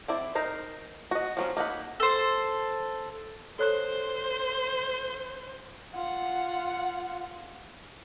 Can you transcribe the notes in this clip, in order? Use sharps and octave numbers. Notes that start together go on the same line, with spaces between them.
C4 E4 D5
D#4 A#4 C5
F#4 D#5
F3 F#3 C#4
A#3 D#4 F#5 B5
A4 C5
A4 C5 C#5 F#6
F4 F#5